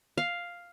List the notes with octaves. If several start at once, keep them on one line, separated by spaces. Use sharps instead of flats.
F5